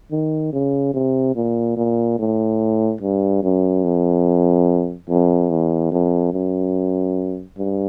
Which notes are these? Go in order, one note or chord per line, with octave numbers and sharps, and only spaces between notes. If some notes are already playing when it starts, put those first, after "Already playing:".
D#3
C#3
C3
A#2
A#2
A2
G2
F#2
F2
F2
E2
F2
F#2
G2